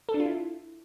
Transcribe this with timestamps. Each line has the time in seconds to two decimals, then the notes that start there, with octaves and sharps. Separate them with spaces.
0.09 A4
0.14 D4
0.20 F4
0.25 E4